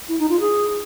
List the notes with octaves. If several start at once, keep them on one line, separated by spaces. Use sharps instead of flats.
E4
D#4
F4
G#4